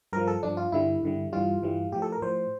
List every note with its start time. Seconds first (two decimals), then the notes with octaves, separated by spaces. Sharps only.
0.13 G2 F3 A#4
0.27 A4
0.43 G2 F3 D4
0.57 F4
0.72 G2 D3 G3 E4
1.03 G2 D3 G3
1.33 G2 E3 G3 F4
1.62 G2 E3 G3
1.92 A2 F3 G4
2.02 A4
2.12 A#4
2.22 A2 F3 C5